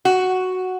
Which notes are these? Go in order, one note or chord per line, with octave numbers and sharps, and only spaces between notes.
F#4